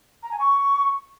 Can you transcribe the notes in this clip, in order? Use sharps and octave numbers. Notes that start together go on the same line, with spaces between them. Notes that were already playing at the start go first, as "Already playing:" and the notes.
A#5
G#5
C#6